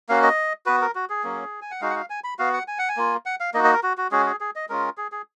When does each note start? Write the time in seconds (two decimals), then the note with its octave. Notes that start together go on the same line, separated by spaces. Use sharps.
0.09 A#3 C#4 F#4 F5
0.23 D#5
0.66 B3 F#4 B4
0.81 A#4
0.95 F#4
1.10 G#4
1.24 F#3 A#3 C#4
1.62 G#5
1.71 F#5
1.81 G#3 D#4 F#4 F5
1.90 F#5
1.96 F5
2.10 G#5
2.24 B5
2.39 B3 F#4 F5
2.53 F#5
2.68 G#5
2.79 F#5
2.89 G#5
2.97 A#3 F4
3.26 F#5
3.40 F5
3.54 A#3 D#4 F#4 D#5
3.64 D#5
3.73 A#4
3.83 F#4
3.98 F#4
4.11 G#3 C#4 F#4 G#4
4.26 G#4
4.40 G#4
4.55 D#5
4.69 G#3 C#4 F4 A#4
4.97 G#4
5.12 G#4